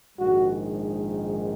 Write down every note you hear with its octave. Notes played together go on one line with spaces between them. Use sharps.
A#1 G#2 D#3 G#3 F#4